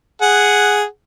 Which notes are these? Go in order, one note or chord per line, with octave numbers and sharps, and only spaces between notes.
G#4 F#5